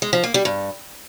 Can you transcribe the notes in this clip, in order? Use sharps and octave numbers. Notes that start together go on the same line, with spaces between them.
G#3
F3
A#3
G3
G2